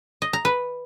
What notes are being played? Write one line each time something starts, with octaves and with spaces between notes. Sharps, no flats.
D#5
A#5
B4